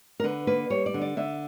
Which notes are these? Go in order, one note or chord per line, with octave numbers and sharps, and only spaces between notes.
A#4
D3 B4
A#3 B4
G3 C#5
D5
D3
D5
D3 E5